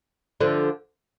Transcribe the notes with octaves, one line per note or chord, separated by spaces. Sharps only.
D3 F3